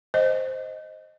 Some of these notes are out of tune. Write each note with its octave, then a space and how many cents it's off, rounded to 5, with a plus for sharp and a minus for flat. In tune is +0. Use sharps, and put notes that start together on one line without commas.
C5 +0 D#5 +0